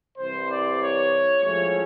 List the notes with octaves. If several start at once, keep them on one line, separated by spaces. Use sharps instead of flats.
C2 C3 E3 G3 C5
D5
C#5
A2 F3 G#3 C#4 E4 C#5